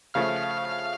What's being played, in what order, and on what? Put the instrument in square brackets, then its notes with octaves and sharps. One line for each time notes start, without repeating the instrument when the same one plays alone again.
[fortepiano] C#3 F3 A3 [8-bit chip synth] F5 F6